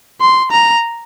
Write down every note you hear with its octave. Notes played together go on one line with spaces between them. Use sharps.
C6
A#5